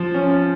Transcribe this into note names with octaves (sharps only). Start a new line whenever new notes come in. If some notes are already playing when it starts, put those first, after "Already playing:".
Already playing: F3
C#4